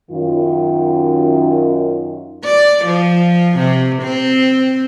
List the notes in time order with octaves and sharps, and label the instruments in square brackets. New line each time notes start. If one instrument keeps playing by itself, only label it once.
[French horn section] F#2 D#3 F4
[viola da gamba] D5
F3
C3
C4